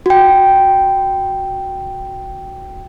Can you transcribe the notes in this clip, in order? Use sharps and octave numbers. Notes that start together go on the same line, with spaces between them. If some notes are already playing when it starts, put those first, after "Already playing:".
F#4 G5